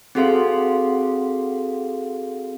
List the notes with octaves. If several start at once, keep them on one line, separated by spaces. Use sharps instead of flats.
C4 F#4 G#4 A4 F5 C6